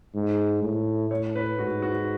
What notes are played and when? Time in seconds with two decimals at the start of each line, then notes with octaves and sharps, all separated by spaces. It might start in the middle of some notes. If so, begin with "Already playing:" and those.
0.15 G#2
0.62 A2
1.11 A2 C#5
1.36 B4
1.59 G#2 F#4
1.82 F#4